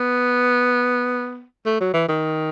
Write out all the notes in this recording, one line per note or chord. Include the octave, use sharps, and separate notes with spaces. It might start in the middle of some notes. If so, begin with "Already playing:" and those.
Already playing: B3
A3
F#3
E3
D#3